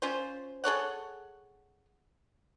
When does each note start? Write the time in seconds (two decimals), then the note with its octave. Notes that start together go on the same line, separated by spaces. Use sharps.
0.02 C#4 F4 C5
0.64 G#4 A4 C#5 F#5